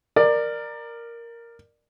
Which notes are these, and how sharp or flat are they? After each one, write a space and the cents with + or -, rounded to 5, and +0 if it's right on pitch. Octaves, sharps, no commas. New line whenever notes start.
A#4 +0 D5 +20